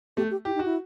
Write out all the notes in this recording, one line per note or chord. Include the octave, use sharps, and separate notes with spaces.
A3 G4
G4
E4 G4
D#4
F#4
E4